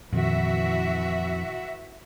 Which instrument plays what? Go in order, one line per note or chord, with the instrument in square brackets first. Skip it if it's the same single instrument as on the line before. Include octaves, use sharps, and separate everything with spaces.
[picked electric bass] F2 [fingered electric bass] A#2 D#3 [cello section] E3 F#4 E5